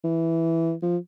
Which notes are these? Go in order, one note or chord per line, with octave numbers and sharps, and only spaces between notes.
E3
F3